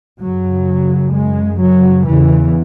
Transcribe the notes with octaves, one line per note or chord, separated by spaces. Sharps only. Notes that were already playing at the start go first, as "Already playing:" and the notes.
F#2 C#3 F#3
G#3
F#3
E2 C#3 E3